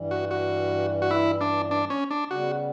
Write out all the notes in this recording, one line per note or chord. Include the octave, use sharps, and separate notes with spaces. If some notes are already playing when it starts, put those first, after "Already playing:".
Already playing: G2 E3 G3
F#4
F#4
F#4
E4
D4
D4
C#4
D4
C#3 G3 B3 F#4